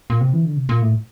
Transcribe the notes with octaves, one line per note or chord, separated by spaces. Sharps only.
A#2
C3
E3
D3
C3
A#2
A2